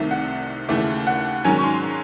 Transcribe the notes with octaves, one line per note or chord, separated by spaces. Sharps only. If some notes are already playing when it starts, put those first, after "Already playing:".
Already playing: C2 C3 D#3 A3
F#5
D#2 C#3 E3 A3
F#5
G#2 D#3 F#3 C#4 G#5
C#6
C6
C6